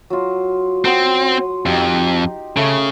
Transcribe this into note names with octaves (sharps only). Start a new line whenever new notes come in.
F#3 F4
C4 F#5 C6 D#6
F2 D#4 G4
C#3 A3